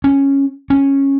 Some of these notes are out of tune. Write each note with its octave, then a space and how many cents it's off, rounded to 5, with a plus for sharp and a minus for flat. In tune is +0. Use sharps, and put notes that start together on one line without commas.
C#4 -5
C#4 -10